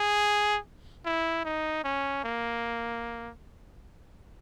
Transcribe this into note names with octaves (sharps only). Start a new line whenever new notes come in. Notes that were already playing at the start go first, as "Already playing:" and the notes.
Already playing: G#4
E4
D#4
C#4
A#3